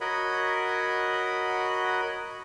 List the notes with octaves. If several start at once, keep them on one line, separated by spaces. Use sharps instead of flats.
F#4 A#4 C#5 D#5 F#5 B5